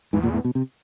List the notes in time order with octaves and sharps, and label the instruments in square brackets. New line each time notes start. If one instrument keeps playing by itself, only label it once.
[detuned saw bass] E2 [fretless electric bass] G#2
[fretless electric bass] A#2
A2
B2
C3